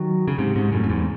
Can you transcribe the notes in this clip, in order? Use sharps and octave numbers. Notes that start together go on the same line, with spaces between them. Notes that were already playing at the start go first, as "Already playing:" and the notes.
Already playing: D#3 F#3
C#3
G#2 C3
G#2 C3
F#2 A2
F#2
E2 G#2